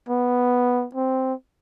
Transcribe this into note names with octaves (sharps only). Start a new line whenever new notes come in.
B3
C4